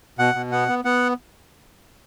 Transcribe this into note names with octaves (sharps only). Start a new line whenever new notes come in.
B2 F#5
B2
B3 F#5
B3
B3 F#5